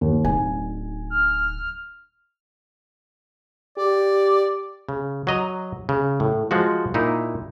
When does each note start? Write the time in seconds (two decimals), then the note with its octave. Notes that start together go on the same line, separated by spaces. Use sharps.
0.01 D#2
0.24 D1 D#4 G#5
1.10 F6
3.78 G4 D5
4.89 C#3
5.27 F#3 D#5 A#5
5.89 C#3
6.20 A2
6.51 F3 G#3 F#4
6.94 A#2 D#4 E4